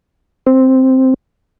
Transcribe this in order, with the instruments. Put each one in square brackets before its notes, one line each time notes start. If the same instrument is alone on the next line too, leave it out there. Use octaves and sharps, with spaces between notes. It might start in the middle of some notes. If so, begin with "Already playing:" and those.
[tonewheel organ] C4